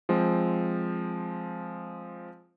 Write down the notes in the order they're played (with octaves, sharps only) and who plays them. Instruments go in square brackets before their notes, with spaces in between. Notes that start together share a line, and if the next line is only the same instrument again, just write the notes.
[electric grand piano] F3 G#3 C4